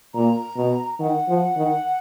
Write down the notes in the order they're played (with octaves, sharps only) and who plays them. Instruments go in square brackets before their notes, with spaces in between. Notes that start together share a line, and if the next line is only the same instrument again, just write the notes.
[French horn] A#2 [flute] A#5
[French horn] B2
[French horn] D#3 [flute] F#5
[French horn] F3
D#3